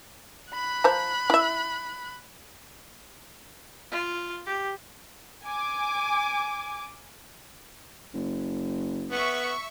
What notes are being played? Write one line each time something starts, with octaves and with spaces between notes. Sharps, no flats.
B5 F#6
F3 C5 A#5
E4 E5
F4
G4
G#5 D6
F#1
B3 E5 C#6